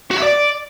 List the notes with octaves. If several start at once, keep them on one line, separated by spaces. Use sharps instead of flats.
F#4
E5
D5